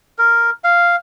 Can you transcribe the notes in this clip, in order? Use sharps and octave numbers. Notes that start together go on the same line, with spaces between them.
A#4
F5